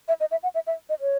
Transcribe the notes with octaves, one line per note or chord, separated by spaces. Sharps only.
E5
D#5
E5
F#5
E5
E5
D#5
C#5